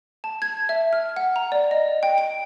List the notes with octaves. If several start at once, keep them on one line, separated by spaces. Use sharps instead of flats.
A5
G#6
E5
F6
F#5
A#5
D5
D#5
G5
D7